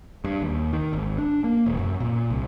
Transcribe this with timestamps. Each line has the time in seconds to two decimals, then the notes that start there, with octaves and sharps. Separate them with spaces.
0.24 G2
0.42 D#2
0.73 D#3
0.93 G#1
1.18 D4
1.44 A#3
1.66 E1
1.79 F#2
2.00 A#2
2.30 C2